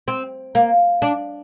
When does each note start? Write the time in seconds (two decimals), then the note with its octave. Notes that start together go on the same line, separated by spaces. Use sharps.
0.08 C4
0.55 A#3
1.02 D4